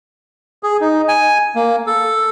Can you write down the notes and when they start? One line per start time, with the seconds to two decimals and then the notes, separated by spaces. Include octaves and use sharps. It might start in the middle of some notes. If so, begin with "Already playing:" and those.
0.63 G#4
0.81 D#4
1.08 G#5
1.55 A#3
1.87 A4